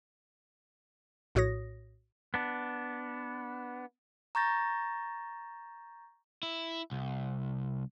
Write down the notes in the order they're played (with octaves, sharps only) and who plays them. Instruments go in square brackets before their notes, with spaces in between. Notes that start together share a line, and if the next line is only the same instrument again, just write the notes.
[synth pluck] A#1 A2 F#4 C#5 D#6 A#6
[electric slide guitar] B3 D4
[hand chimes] A#5 C#6 G6 A6 A#6
[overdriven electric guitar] E4
C2